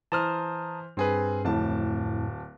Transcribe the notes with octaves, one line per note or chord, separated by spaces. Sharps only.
E3 C5 A5 A#5 D#6 F6
G2 C4 G#4 B4
D1 F2 A2 A5